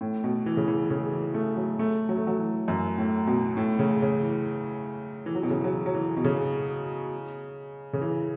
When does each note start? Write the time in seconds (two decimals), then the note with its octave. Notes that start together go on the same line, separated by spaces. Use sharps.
0.01 A2
0.24 B2
0.46 E3
0.57 C#3
0.68 E3
0.90 C#3
1.12 E3
1.34 A3
1.56 F#3
1.79 A3
2.09 F#3
2.17 A3
2.27 F#3
2.38 E3
2.68 F#2
2.98 A2
3.27 B2
3.57 A2
3.79 C#3
4.02 C#3
4.23 E3
5.26 E3
5.35 F#3
5.43 B2
5.50 C#3
5.57 E3
5.64 F#3
5.86 F#3
5.94 E3
6.17 B2
6.24 C#3
7.93 C#3
8.01 E3